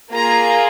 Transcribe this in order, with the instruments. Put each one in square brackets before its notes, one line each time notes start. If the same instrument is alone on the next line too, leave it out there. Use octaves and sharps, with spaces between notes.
[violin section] A#3 F4 G#4 A#5